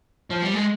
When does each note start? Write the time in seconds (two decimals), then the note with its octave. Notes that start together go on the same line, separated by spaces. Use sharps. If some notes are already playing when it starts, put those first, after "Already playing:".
0.30 F3
0.43 G3
0.54 G#3